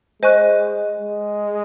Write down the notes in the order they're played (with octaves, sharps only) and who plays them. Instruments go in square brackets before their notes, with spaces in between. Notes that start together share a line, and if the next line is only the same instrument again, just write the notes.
[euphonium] G#3 [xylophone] C5 D#5 G#5 C#6 F#6
[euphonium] G#3